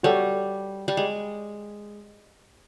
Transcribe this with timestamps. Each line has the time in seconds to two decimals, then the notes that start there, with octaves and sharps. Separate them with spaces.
0.03 G3 F#4 A4 C#5 F#5
0.88 G3
0.97 G#3